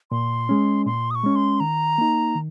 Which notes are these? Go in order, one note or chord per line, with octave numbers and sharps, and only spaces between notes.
A#2 C6
G#3 C#4
A#2 C6
D#6
C#6
G#3 C#4
C6
D#3 A#5
A#3 D#4
D#3